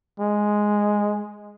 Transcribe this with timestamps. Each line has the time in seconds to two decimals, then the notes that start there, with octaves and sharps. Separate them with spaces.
0.20 G#3